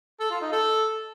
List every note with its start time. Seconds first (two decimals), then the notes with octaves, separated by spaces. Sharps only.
0.20 A4
0.31 F4
0.41 D#4
0.52 A4